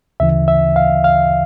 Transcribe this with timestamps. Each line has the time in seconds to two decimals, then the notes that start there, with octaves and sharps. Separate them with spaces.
0.20 D2 C#3 E3 E5
0.48 E5
0.76 F5
1.04 F5